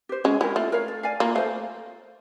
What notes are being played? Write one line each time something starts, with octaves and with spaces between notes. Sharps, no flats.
G4 C5
G#3 C#4
G#3 E4 G4 A#4
A3 F4
A#4 C#5 F5
A4
D5 F5 G#5
A#3 F4
A3 C5 F5